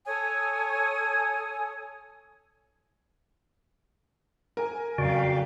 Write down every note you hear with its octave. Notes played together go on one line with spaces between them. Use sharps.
A4 C#5 G#5 D#6
A#4 G#5
F2 C#3 F#3 F#4 D5 F5 G5